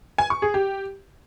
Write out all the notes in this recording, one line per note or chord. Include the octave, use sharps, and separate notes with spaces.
G#5
C#6
G#4
G4